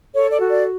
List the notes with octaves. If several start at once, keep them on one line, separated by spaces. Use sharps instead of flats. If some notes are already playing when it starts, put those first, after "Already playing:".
A4 C#5
D5
F#4
D5